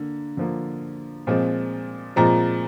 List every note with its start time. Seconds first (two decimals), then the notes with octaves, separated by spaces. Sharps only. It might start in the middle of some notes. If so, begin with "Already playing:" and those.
Already playing: D3 A#3
0.37 D3 F3 A#3
1.27 A#2 F3 G#3 C4
2.16 A#2 F3 G#3 C4 A#5